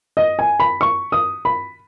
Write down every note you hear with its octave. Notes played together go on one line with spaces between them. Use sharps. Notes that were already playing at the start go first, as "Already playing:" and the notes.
D#5
G#5
B5
C#6
D#6
B5